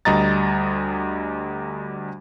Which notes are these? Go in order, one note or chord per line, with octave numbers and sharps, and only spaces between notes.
D2 G3 D#5 A#5 A6